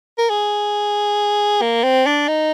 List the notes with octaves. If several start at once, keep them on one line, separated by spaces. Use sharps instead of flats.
A#4
G#4
A#3
C4
D4
D#4